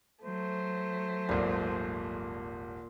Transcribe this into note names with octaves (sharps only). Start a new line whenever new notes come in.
F#3 A3 C5
D#1 G#1 A#2